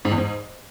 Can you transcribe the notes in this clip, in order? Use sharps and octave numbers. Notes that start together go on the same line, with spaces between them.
G#2
E2
G#2